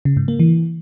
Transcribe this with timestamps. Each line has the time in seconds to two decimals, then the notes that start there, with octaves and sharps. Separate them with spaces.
0.05 C#3
0.17 G#2
0.28 A#3
0.40 E3